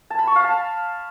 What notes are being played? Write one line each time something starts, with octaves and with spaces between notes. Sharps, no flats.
A5
B5
C#6
F5
A5